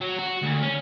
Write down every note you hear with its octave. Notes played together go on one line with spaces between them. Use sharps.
F#3
F#4
D2
C#4